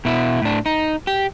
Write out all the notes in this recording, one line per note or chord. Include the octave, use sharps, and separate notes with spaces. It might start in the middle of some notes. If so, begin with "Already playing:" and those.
B2 E4
A2 D4
D#4
G4